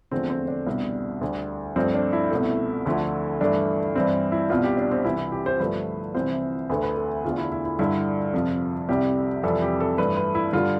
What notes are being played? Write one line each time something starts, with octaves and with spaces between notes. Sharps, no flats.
E2 D3 F3 A3 C4
C4
D4
C2 B2 G3
D2 D3 G3
G2 F3 A3 C4
D4
E4
C2 B2 A3
D2 D3 F3 A3
G2 E3 A3 D4
G2 E3 G3 C4
E4
C2 B2 G3 F4
G4
D4
C4
C2 C3 E3 E4
G4
C5
G2 D3 F3 A3 B4
C2 C3 E3 C5
D2 D3 A3 B4
B4
A4
E2 D3 A3 F4
E4
E4
E4
G2 D3 G3 E4
F2 C3 F3 F4
C2 C3 G3 G4
F2 C3 E3 G3 A4
G4
A4
G2 E3 A3 B4
B4
E4
G2 D3 G3 F4